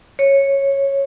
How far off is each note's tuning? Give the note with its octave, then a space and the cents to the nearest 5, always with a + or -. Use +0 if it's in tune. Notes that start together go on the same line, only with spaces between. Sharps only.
C#5 -10